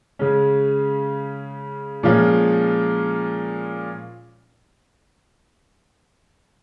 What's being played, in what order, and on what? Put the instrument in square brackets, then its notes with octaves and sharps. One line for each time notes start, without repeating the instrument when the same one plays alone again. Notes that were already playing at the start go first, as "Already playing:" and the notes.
[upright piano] C#3 G#3 C#4
A#2 F3 G#3 C#4 F4